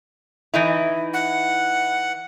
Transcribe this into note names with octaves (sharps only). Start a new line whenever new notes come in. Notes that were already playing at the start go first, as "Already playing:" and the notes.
E3 D#4 E4
F#5